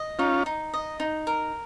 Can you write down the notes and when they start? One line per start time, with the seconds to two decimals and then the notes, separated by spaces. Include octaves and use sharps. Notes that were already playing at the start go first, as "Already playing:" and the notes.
Already playing: D#5
0.19 C#4 D#4 F4
0.46 D#4
0.73 D#5
1.00 D#4
1.27 A#4